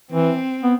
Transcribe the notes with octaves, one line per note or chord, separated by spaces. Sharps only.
E3 C4
B3